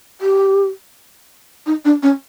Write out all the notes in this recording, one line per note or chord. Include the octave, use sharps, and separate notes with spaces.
G4
D#4
D4
C#4